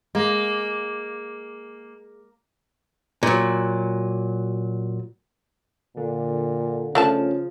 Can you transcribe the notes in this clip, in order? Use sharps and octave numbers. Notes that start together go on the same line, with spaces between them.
G#3 A#3
A#2 F#3
A#2 D3
C#3 F3 A3 C#4 D4 A5